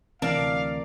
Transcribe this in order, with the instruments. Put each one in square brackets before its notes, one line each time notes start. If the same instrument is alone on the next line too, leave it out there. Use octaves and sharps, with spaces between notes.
[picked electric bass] D2 E3 C4 [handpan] C3 [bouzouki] A#4 D5 A5 [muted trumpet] F5